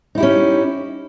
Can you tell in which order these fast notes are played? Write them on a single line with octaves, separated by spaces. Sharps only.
D#4 E4 G4 C#4